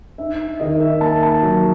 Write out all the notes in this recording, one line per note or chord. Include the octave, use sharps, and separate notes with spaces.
D#4 E5
D#3 D#5
E5
A#3 A5
A5
F#3